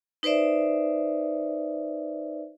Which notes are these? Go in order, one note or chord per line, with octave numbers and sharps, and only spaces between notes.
D#4 B4 C5 D5 E5